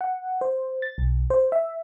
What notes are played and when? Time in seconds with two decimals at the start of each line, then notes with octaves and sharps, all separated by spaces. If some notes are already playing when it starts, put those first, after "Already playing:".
0.01 F#5
0.41 C5
0.82 A6
0.98 B1
1.30 C5
1.52 E5